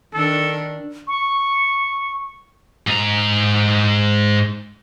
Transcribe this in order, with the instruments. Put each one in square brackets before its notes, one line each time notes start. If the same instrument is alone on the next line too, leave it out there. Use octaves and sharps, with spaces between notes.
[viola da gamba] D#3 D4 [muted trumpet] A4
[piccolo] C#6
[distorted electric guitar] G#2 A#5